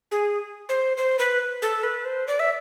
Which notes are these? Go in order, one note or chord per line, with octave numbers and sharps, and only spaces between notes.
G#4
C5
C5
B4
A4
B4
C5
D5
E5